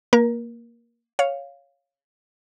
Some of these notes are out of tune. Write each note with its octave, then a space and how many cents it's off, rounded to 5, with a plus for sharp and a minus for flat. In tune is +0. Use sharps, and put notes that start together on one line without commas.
A#3 +0 A#4 +30
C#5 +0 F5 +0